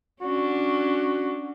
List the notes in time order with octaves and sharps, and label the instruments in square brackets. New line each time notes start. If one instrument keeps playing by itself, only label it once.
[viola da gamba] C#4 D4 [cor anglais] F#4